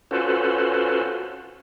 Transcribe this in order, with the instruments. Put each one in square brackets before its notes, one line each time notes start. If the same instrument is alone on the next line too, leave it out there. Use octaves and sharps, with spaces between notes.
[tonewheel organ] C#4 F4 F#4 A4 B4 C5